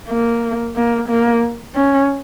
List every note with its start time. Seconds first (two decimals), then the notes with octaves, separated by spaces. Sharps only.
0.09 A#3
0.76 A#3
1.09 A#3
1.75 C#4